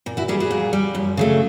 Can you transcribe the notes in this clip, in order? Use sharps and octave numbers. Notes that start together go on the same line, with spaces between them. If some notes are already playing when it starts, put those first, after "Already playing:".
A#2
E4 F#4
G3 F#4 G#4
F#4 G#4
A#2
G3
F#2
C#3 F#3 A3